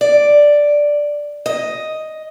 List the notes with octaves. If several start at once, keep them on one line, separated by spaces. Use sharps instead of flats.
D5
D#5